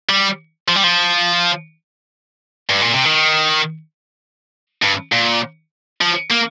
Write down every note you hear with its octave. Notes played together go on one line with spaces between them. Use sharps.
G3
F3
G3
F3
G2
A#2
C3
D#3
G2
A#2
F3
A#3